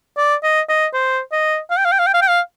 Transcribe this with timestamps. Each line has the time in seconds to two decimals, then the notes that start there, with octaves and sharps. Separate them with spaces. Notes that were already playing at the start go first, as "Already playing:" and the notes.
0.18 D5
0.43 D#5
0.69 D#5
0.94 C5
1.32 D#5
1.70 F5
1.77 G5
1.85 F5
1.92 G5
1.99 F5
2.07 G5
2.14 F5
2.22 G5
2.29 F5